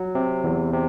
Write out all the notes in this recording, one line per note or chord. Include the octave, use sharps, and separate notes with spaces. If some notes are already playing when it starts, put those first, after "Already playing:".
Already playing: F#3
C3
E2
C3